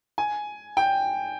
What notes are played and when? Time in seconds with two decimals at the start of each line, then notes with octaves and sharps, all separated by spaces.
0.18 G#5
0.77 G5